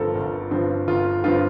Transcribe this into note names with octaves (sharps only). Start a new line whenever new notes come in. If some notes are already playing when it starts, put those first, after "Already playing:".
Already playing: G1 G2 D3 F3 C4 A4 A#4
G1
G2 D3 F3 C4
G1 F4
G2 D3 F3 C4 F4